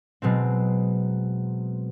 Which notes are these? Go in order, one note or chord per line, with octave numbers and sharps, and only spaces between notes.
B2 F#3 G#3 C4